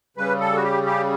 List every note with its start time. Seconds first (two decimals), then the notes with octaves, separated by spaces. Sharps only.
0.17 C#3 G3 B4
0.40 A4
0.55 F#4
0.63 G4
0.86 G4